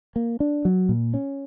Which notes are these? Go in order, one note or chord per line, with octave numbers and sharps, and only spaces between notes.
A#3
D4
F#3
A#2
C#4